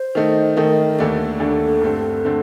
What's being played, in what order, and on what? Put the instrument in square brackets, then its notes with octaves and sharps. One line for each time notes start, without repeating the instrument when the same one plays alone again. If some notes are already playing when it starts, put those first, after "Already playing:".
Already playing: [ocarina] C5
[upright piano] D#3 A3 D#4
[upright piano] D#3 A3 D#4 [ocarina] A#4
[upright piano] D#2 D3 A3 D4 [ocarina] A4
[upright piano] D#2 D3 A3 D4
G2 D3 A3 C4
D3 A3 C4